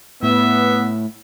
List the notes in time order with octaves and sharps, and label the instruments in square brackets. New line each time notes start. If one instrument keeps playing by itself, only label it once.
[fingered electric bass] A2 [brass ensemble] B3 [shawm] E5